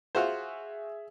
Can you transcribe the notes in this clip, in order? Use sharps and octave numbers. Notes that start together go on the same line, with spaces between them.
F4 F#4 G#4 C5 E5